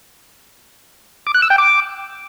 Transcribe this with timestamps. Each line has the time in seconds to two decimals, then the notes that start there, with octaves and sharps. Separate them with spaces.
1.27 D6
1.34 F#6
1.42 E6
1.50 G5
1.58 D6